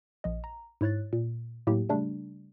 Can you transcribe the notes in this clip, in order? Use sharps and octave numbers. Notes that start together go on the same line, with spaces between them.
A#1 D#5
A#5
G#2 E4 C#5 F#6 A6
A#2
A2 F#3 A#3 E4 G4
C#3 G3 A3 D4